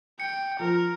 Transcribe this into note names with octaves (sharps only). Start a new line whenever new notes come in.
G5 C#7
F3 A#4